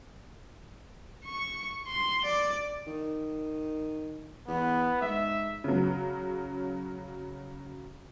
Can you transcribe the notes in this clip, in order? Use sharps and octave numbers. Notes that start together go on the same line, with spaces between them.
C#6
C6
D5
D#3
E2 B3
G#2 E5
C#3 F#3